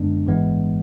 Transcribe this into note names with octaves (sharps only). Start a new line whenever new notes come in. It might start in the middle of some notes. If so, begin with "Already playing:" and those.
Already playing: F#2 D3 G#3 B3 D4
A1 G#2 E3 G#3 B3